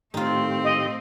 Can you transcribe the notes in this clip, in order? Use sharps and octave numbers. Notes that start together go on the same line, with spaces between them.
A2 D#3 A3 C4 D#4 F4 G4
D#5